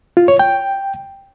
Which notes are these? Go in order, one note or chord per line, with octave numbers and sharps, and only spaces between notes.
F4
C#5
G5